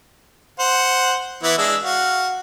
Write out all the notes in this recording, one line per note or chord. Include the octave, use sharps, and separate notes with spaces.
C5 F#5
E3 B3 E4
G#3 D4 E6
F#4 F5